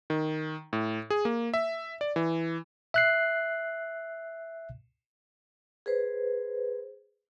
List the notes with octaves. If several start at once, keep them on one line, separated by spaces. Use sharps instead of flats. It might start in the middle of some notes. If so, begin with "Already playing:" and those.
D#3
A2
G#4
A#3
E5
D5
E3
E5 F#6 C7
G#4 B4 C5